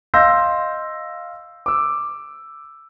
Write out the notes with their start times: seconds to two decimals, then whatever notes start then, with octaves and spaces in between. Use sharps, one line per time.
0.14 D#5 F5 C6 E6 G6 A#6
1.66 D6 E6